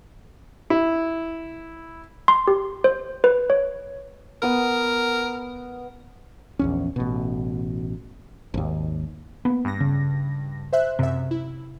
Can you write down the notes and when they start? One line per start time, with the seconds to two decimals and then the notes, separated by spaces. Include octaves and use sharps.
0.70 E4
2.28 C6
2.48 G4
2.84 C5
3.24 B4
3.50 C#5
4.42 B3 A#4 D#6
6.59 A#1 E2 C#4
6.96 A1 B2
8.54 G#1 D#2
9.45 A#3 B3
9.65 G2 A#6
9.80 C#3
10.73 C5 E5 F#6
10.99 F#2 C3 E5
11.31 E4